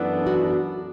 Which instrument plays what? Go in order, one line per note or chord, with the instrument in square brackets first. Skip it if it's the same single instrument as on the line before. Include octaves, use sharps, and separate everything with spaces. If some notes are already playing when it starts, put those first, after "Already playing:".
Already playing: [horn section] F#2 E3 B3 D4 A4 [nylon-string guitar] E4
[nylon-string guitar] F#4